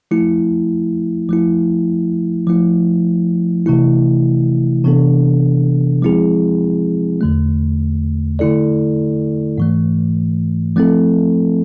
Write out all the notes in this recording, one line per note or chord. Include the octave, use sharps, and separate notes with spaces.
F3 A3 E4
F3 A3 E4
F3 A3 E4
C3 E3 A3 E4
C3 E3 B3 D4 A4
F3 G#3 C4 E4 G#4
E2 D3 A3
D3 A3 E4 A4 D5
G#2 E3 A3
F3 A3 C4 E4 A4